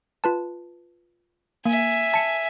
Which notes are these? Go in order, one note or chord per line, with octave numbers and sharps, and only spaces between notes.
F4 B4 A5
A#3 E5 G#5
A5 C#7